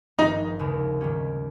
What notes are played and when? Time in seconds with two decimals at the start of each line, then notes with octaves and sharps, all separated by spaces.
0.18 G#1 G2 F3 D#4
0.59 F1 D#2 C#3 G#3
1.01 G#2 D#3 G3 C#4 G4